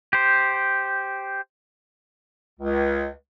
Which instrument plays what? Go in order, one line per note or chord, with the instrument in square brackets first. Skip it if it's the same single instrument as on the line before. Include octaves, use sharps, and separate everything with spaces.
[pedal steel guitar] G4 C5
[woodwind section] C#2